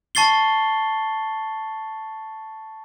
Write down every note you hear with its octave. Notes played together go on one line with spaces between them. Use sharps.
A5 C#6 A6 C7 G7